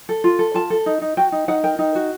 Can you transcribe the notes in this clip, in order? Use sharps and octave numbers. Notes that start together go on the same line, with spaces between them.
A4
F4
A4
F4 A5
A4
D#4
D#4
F#4 G5
D#4
D#4 F#5
A#4 G5
D#4
F#4